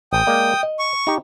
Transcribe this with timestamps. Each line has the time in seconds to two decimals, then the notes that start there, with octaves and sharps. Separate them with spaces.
0.13 A1 G5 D#6
0.27 G#3 A#3 D5
0.63 D#5
0.79 C#6
1.07 D#4 G4